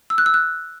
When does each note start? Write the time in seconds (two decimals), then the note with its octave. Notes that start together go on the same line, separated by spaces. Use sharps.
0.10 E6
0.18 F#6
0.26 E6
0.34 F#6